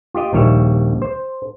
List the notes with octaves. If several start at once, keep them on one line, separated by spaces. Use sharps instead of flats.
F4 G4 D#5
A#1 D#2 G3 C#5 E5
C5